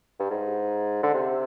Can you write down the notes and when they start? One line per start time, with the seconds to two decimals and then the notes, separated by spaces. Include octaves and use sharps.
0.19 G2
0.30 G#2
1.03 D3
1.14 C3